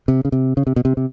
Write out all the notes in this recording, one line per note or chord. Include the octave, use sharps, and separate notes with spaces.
C3
C#3
C3
C#3
C3
B2
C3
C3